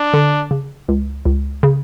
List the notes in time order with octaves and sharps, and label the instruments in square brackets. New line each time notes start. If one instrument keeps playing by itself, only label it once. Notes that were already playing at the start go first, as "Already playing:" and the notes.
Already playing: [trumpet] D4
[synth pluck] D3
C#3
C#2
C#2
C#3